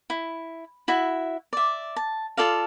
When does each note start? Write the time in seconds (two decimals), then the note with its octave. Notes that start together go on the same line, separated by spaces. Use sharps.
0.10 E4
0.88 E4 F#4 E5
1.53 D5 E5
1.96 A5
2.37 F4 A4 D5 F5